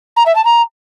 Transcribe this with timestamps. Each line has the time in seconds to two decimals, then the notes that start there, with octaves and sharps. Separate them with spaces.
0.17 A#5
0.26 E5
0.36 A5
0.45 A#5